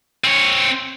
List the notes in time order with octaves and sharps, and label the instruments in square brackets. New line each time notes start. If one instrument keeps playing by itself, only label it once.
[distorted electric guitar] C4 C#5